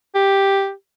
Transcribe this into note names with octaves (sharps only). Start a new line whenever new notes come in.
G4